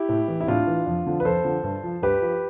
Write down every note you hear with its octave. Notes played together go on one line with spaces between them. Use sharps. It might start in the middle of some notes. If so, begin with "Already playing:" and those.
Already playing: E4 G4
A2
E3
E4
A2 D4 F4
E3
F2
D3 F3
B4
F2 A4 C5
D3 F3
G2
F3
G2 G4 B4
F3